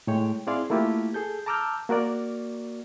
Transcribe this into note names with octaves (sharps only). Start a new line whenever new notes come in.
A2 G#3 C#5 G5
C4 E4 G#4 D5 F5 C6
A3 A#3 E4 F4 G4
G#4 A4 G6
A5 A#5 D6 E6 F6 G6
A#3 F#4 A#4 D5